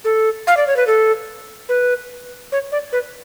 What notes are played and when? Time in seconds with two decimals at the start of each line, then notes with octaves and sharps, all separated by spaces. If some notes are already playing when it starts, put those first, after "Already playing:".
0.05 A4
0.47 F5
0.57 D5
0.67 C#5
0.76 B4
0.87 A4
1.69 B4
2.52 C#5
2.72 D5
2.93 B4